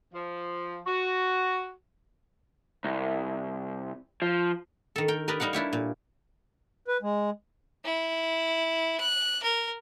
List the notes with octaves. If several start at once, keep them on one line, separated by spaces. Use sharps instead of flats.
F3
F#4
C2
F3
D#3 A4
A#4 G5
G4 A#4 B4 D5 D#5
G3 D#4 A#4 F5 F#5
D4 E4 G4 C#5
A#2
B4
G#3
E4
F#6
A#4